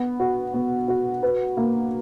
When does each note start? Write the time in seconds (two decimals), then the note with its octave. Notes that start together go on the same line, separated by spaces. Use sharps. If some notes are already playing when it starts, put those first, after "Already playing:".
Already playing: B3
0.20 F#4
0.54 B3
0.88 F#4
1.23 B4
1.57 A#3